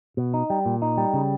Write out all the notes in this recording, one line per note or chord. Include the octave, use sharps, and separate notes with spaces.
B2
D#4
G3
A#2
D#4
G3
C#3